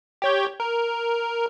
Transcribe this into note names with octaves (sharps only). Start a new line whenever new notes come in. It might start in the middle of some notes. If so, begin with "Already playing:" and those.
G4 C#5 G6
A#4